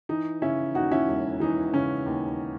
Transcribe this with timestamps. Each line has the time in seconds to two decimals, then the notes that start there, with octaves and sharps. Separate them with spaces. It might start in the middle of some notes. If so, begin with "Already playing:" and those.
0.09 E3 D#4
0.42 C#3 C#4 E4
0.75 D#2 D#4 F#4
0.91 C#4 E4
1.08 E1
1.40 E3 D#4
1.73 C#3 C#4
2.06 D#2